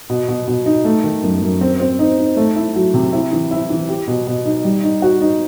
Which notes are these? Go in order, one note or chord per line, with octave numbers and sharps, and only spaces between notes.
B2
B2
B2
D#4
A3
D#3
F#2
F#2
C4
C4
D#4
D#4
A3
E4
F#3
C3
E4
E3
E4
E3
G4
B2
B2
D#4
G3
D#4
F#4
D#4